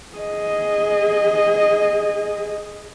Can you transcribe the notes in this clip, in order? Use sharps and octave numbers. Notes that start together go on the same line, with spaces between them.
G#4 D#5